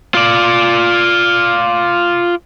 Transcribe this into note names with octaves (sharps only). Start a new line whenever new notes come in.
F4 D5